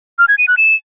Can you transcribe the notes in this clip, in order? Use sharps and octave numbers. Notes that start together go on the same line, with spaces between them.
F6
G#6
D#7
F#6
E7